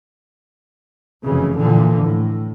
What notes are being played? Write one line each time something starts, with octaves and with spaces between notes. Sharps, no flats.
F1 F#2 C#3 E3
A#2 D3 E3 F3
A2